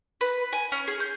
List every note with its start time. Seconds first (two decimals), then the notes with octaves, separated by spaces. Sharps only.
0.21 B4
0.53 G#5
0.72 C#4
0.88 G#4
1.00 G6